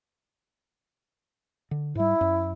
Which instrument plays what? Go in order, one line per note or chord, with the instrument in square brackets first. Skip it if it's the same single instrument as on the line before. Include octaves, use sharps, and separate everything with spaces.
[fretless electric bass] D3
[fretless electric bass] G#2 G3 [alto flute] E4
[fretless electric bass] F#2